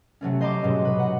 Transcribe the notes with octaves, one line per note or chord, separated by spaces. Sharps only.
C3 F#3 A3 C#4
C5 D#5 A#5 C6 D6
G#2 B2 F#3 G#3
B4
F#4 F#5